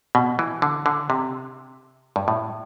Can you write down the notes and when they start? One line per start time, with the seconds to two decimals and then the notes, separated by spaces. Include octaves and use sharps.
0.15 B2
0.39 E3
0.62 D3
0.86 D3
1.10 C3
2.16 G2
2.28 A2